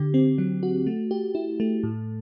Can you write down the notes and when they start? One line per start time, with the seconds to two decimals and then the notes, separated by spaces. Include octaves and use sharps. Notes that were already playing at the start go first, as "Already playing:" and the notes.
Already playing: D3 G4
0.14 C4
0.38 F#3
0.63 F#4
0.87 A3
1.11 G4
1.35 E4
1.60 A3
1.84 A2